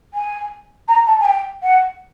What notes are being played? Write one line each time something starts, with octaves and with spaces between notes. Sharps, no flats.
G#5
A#5
A5
G#5
G5
F#5